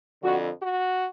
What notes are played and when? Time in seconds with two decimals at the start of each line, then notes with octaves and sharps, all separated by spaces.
0.23 F2 D3 F3 F#4
0.62 F#4